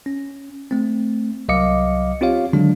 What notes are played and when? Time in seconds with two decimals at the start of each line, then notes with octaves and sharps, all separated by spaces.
0.06 C#4
0.71 A3 C4
1.49 C2 F#3 D#5 F5 D6 C#7
2.21 C4 F4 G4 C#5 F5
2.53 D3 D#3 F#3 G#3 D4